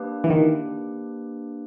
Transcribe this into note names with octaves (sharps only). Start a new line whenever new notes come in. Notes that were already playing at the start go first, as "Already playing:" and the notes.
Already playing: A#3 D4 G4 B4
E3
D#3